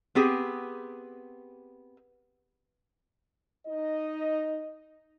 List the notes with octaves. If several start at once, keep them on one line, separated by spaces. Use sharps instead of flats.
B3 C4 G4 G#4
D#4 D#5